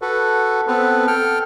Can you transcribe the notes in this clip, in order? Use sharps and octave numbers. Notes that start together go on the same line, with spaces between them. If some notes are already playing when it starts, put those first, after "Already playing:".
F#4 A4 B4
B3 C4 A4 B4
A4 G5 F6